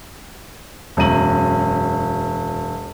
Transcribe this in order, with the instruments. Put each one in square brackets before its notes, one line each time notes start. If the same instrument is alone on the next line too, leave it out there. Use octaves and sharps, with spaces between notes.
[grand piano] E1 F#2 A#5 D#7 F#7